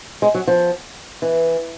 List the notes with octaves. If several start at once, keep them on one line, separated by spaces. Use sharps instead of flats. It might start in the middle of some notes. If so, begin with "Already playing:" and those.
G#3
F#3
F3
E3